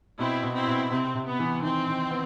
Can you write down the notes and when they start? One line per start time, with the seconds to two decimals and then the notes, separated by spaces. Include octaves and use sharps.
0.19 B2 C4 E4
0.43 B2
0.55 C4 E4
0.67 B2
0.90 C3 C4
1.15 C3
1.27 B3
1.39 E3
1.62 D#3 C4
1.87 D#3
2.10 B3